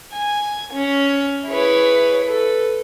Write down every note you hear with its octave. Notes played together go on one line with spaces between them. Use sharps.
G#5
C#4
E4 G#4 B4 C#5
A4 B4